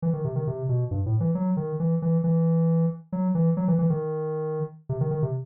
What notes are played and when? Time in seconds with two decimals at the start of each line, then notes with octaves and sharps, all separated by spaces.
0.02 E3
0.13 D#3
0.25 C3
0.35 D#3
0.47 C3
0.69 B2
0.91 G2
1.06 A2
1.20 E3
1.35 F#3
1.57 D#3
1.80 E3
2.02 E3
2.24 E3
3.12 F#3
3.35 E3
3.57 F#3
3.68 E3
3.79 E3
3.90 D#3
4.89 C3
5.01 D#3
5.11 D#3
5.23 C3